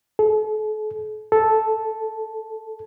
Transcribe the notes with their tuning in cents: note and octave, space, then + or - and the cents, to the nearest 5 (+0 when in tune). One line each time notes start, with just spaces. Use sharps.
A4 -40
A4 -5